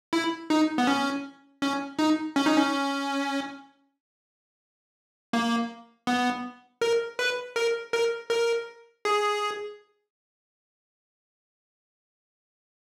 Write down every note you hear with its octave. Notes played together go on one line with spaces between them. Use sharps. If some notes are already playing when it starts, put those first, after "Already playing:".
E4
D#4
B3
C#4
C#4
D#4
C#4
D#4
C#4
A#3
B3
A#4
B4
A#4
A#4
A#4
G#4